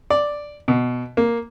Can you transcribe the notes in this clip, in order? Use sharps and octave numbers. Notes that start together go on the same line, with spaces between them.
D5
B2
A#3